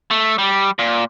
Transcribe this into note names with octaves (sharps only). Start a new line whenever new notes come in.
A3
G3
A#2